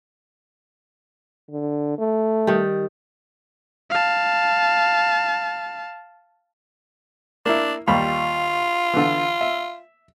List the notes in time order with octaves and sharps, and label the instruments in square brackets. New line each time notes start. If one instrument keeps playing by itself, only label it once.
[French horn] D3
A3
[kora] D#3 G3
[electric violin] F5 A5
[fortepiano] A#3 E4 [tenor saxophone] D4
[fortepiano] D#2 G3 B5 [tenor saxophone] F4
[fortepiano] D3 E3
E5